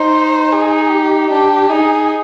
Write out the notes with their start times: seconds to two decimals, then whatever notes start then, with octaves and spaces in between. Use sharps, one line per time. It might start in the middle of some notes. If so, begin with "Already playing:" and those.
Already playing: D#4 C5
0.53 G#4
0.91 G4
1.30 D4 G4
1.70 D#4 G#4